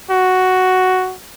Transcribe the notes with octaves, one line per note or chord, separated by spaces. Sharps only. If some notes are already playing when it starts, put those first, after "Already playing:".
F#4